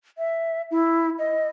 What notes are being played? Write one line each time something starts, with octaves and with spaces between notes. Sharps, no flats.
E5
E4
D#5